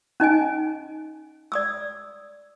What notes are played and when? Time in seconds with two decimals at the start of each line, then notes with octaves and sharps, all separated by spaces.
0.20 C#4 D#4 D#5 G#5
1.52 D5 D#6 E6